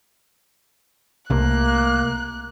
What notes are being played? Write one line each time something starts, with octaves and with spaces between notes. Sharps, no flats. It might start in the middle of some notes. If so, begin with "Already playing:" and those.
C2 C3 A3 A#3 F#6